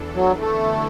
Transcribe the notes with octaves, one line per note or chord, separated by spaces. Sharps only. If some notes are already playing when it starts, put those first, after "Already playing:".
Already playing: E2 E3 D4 A4
F#3
F#2 D3 A3 B3 E4 A4